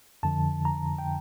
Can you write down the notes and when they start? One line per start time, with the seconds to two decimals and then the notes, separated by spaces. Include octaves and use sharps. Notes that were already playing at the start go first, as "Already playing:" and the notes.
0.23 F2 D3 F3 A5
0.65 A#5
0.98 G5